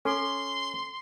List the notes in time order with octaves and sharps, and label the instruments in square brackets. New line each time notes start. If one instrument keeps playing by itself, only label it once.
[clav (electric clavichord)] C#4 [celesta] A4 [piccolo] C6